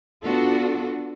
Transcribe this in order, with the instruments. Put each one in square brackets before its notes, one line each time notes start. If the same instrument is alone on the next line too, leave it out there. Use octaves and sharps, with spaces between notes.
[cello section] B3 D4 F4 F#4 A4